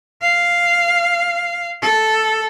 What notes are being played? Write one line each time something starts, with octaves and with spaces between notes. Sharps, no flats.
F5
A4